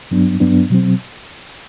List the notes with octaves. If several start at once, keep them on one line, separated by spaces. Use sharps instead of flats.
G2 F#3 B3 D4
G2 F#3 B3 D4
B2 F#3 C4